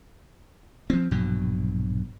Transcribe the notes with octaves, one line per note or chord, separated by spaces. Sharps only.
F3 C4
A#1 G2 B2 F#3